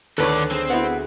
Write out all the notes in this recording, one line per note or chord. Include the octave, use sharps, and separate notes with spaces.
D2 D#3 A4 B4 C#5 D5 F#6
C4 G#4
B3 E4 F#4